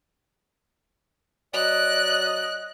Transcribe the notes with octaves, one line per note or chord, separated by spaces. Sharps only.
F#3 D5 D#5 F#6